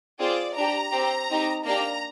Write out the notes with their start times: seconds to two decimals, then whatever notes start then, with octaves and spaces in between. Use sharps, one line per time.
0.19 C4 F4 G#4 D5
0.56 D4 G4 A#5
0.92 C4 G4
1.30 C4 D#4 G4
1.65 A#3 D4 G4 A#5